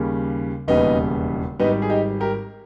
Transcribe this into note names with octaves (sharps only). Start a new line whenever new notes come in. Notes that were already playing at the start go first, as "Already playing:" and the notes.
Already playing: D#2 C#3 G3
E1 D#2 C#3 G3 B3 D#4
G#1 G#2 G3 B3 D#4
G#4
D#4 G4
G4 A#4